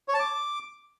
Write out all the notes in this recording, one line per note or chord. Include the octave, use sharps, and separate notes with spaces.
C#5
A5
D6